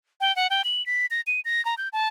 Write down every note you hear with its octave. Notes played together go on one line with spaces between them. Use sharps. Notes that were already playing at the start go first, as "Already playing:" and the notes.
G5
F#5
G5
F#7
B6
A#6
D#7
A#6
A#5
G6
A5